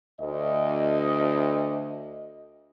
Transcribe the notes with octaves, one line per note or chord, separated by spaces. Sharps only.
D2 D#5